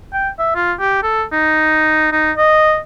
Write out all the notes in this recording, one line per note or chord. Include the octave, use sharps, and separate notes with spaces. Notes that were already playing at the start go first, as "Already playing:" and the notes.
G5
E5
F4
G4
A4
D#4
D#4
D#5